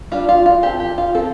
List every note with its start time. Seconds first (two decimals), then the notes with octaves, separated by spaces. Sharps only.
0.12 G3 D4 F4
0.29 F4
0.46 F4
0.63 F3 C4 G4
0.80 G4
0.98 F4
1.14 F3 C4 A4